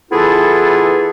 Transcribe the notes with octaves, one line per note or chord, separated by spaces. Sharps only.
E3 B3 E4 F4 G#4 A4